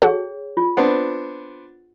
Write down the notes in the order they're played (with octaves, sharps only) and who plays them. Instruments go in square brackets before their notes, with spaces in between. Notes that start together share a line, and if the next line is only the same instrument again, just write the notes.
[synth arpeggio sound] F#4 A4 [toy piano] G#4 C#5 G5
[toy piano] F4
[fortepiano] B3 C4 D4 [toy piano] F#5